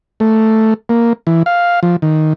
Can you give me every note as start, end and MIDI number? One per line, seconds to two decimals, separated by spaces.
0.20 0.74 57
0.89 1.13 58
1.27 1.43 52
1.46 1.80 77
1.83 1.96 53
2.02 2.33 51